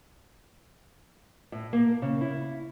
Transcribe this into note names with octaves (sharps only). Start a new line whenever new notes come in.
A2
A#3
C#3
E4